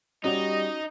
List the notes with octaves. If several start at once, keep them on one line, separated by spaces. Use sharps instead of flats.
G3 C#4 D#4 F#4 D5 D#5